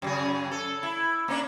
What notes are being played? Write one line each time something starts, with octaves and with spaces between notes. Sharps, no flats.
F#2 C#3 G#4
A4
E4
A#3 C#4 D4